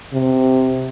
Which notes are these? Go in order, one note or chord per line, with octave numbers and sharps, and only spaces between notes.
C3